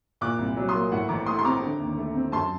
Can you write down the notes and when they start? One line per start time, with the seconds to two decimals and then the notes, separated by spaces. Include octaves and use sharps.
0.21 A#2 D6 F#6
0.38 C2
0.57 F#3
0.69 C6 D#6
0.74 A#3
0.92 A2 F#5
1.09 A1 A#5 D6
1.26 A3 C6 D#6
1.39 C6
1.45 C4 A#5 D6
1.63 D3
1.80 D#2
1.97 A3
2.15 C4
2.32 F#2 A5 C6